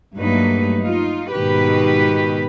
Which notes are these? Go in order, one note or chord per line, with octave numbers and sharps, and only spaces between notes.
G2 F#3 A3 A#3 D#4 B4
D#4 F4
G#2 B2 D#3 G4 B4